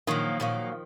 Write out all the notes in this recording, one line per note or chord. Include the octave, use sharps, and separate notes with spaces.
A#2 D#3 F3 F#3 A#3
A#2 F#3 A#3